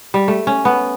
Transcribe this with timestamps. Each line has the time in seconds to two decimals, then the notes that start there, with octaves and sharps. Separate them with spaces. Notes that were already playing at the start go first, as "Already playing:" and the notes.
0.14 G3
0.28 A3
0.47 C#4
0.65 B3